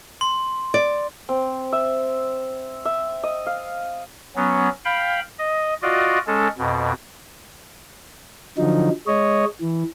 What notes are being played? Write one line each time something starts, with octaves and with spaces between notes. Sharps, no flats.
C6
D5
C4
E5
E5
D#5
F5
F#3 B3 C#4
F5 G5 B5
D#5
F4 F#4 D5 D#5
G#3 C#4 A4
F2 B2
D3 F3 F#3 D#4
G#3 C#5 D#5
E3